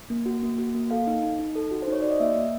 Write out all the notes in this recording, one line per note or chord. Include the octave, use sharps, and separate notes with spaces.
A#3
F#4
A#3
F#4
A#3
A4 F5
D#4
D#4
D#4
A4
F#4
C5
D#4 C#5
F#4 D5
D#5
A#3 E5
A#3